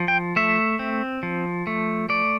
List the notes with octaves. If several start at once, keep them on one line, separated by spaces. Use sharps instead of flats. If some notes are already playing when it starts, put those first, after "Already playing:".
Already playing: F3
G5
A3 E5
C4
F3
A3
A3 D5